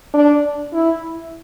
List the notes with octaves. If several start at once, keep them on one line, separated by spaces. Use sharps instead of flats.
D4
E4